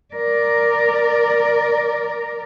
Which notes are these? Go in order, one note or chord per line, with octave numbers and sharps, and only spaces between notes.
A#4 D5